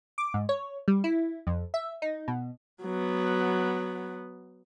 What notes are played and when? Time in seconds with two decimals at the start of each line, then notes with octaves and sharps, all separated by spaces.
0.18 D6
0.34 G#2
0.49 C#5
0.88 G3
1.04 E4
1.47 F2
1.74 E5
2.02 D#4
2.28 B2
2.82 F#3 B3